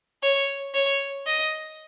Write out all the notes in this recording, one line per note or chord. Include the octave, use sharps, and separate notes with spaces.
C#5
C#5
D#5